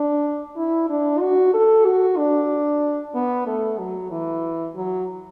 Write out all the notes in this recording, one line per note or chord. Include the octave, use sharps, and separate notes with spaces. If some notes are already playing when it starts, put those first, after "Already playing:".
Already playing: D4
E4
D4
F#4
A4
F#4
D4
B3
A3
F#3
E3
F#3